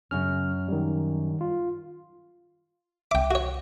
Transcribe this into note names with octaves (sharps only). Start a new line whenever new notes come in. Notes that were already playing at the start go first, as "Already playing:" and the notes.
F#2 C#3 C#4 F6
D#3 G3
F4
C2 E5 G5 D6
F#4 C#5